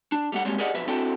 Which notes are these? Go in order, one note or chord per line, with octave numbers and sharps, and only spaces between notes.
D4
G3 A3 F#5
G3 G#3 A#3 C4 G4 C#5
G4 G#4 A#4 D5 D#5 F#5
B1 F2 F3 F#3 B4 E5
C4 D4 E4 F#4 A4 G5